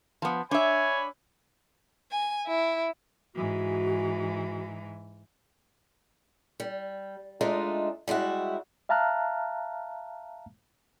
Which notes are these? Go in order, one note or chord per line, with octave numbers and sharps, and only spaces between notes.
F3 B3
D4 C#5 E5 G#5 B5
G#5
E4
G#2 E3 F#4
G3
G#3 A3 D4 D#4 F4
G3 G#3 E4 F#4
E5 F5 A5 A#5 F6 F#6